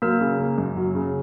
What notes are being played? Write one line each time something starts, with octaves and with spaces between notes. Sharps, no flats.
F#3 A#3 A#4
C#3
A#3
F#2
F#3
C#3